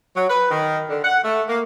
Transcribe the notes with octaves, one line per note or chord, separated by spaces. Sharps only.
F#3
B4
D#3
D3
F#5
A3
A#3